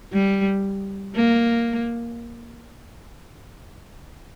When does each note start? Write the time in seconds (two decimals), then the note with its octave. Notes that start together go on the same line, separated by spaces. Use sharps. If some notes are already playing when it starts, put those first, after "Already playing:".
0.13 G3
1.16 A#3